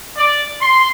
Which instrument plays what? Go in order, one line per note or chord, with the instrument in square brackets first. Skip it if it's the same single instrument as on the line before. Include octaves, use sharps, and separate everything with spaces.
[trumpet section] D5
C6